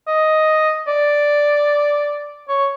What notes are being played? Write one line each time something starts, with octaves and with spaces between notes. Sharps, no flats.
D#5
D5
C#5